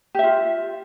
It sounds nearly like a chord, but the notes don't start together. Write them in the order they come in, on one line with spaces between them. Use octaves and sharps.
G4 E5 F4